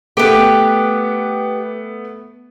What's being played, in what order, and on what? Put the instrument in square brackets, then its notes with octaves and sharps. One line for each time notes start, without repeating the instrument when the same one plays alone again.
[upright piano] A3 B3 [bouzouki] G4 B4